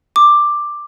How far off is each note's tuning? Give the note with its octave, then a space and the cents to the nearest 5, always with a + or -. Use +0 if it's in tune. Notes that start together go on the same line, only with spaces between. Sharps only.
D6 +10